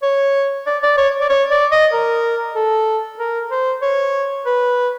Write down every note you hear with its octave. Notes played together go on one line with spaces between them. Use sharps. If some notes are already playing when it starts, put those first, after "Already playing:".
C#5
D5
D5
C#5
D5
C#5
D5
D#5
A#4
A4
A#4
C5
C#5
B4